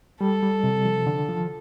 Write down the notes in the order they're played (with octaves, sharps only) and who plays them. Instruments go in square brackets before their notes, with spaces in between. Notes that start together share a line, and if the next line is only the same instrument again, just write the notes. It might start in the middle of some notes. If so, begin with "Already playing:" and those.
[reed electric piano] G3 [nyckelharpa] A4
[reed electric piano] G3
C3
F3
D3
F3